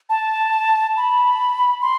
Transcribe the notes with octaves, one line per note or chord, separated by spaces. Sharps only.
A5
B5
C6